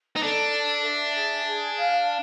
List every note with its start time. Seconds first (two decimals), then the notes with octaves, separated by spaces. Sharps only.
0.16 D#4
0.22 D4 A4
0.53 A5
0.84 E5
1.15 G#4
1.46 G#4
1.76 F5